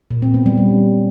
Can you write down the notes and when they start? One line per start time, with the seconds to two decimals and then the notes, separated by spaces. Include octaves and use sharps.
0.11 A#2
0.22 C4
0.34 B3
0.46 G3
0.58 C#4